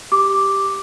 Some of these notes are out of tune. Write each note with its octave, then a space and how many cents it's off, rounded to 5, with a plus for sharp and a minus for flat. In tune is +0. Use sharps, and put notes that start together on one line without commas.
G4 +0 D6 +0